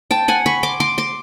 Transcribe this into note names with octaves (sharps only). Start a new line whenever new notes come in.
G5 A5
F#5 G#5
B5 C#6
C6 D6
C6 D6
C6 D6